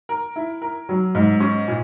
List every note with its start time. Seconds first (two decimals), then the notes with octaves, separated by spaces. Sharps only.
0.09 A#4
0.36 E4
0.62 A#4
0.89 F#3
1.15 G#2
1.40 C#4
1.68 A#2